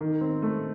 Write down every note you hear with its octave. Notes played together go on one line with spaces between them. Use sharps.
D#3
C4
A3